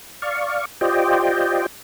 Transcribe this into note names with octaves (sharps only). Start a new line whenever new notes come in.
D5 F5 C#6
F4 G4 C5 D5 D#5 G5